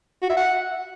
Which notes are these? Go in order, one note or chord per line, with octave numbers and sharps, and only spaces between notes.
F#4
E5
F#5